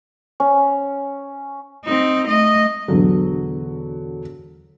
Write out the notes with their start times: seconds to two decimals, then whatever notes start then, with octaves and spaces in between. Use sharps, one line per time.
0.40 C#4
1.85 C4 D#4
2.27 A3 D#5
2.88 E1 D3 F#3